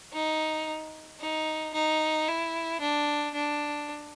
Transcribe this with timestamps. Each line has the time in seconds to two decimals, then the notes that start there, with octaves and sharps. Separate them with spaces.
0.13 D#4
1.20 D#4
1.74 D#4
2.28 E4
2.81 D4
3.34 D4